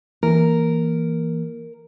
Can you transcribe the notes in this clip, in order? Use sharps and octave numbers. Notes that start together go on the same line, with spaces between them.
E3 A#3 A#4